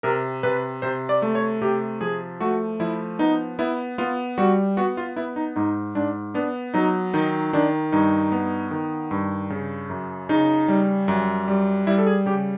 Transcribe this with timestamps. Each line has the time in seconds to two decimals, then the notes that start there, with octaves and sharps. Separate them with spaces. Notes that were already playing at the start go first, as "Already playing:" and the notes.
0.03 C3 A#4
0.43 C3 B4
0.82 C3 C5
1.09 D5
1.22 A3
1.35 C#5
1.61 C3 G4
2.01 F3 G#4
2.40 A3 F#4
2.80 F3 E4
3.19 B3 D#4
3.59 B3 E4
3.98 B3 F4
4.38 G3 F#4
4.77 B3 F#4
4.97 F4
5.16 B3 E4
5.36 D#4
5.56 G#2 D#4
5.95 G#2 D4
6.34 B3 D4
6.74 F#3 D#4
7.13 D#3 D#4
7.53 D#3 D4
7.92 G2 D#4
8.32 B3
8.71 D#3
9.11 G2
9.50 C#3
9.90 F#2
10.29 C#3 D#4
10.68 G3
11.08 F#2
11.48 G3
11.87 G3 E4
11.98 A4
12.07 G#4
12.26 C#3 G4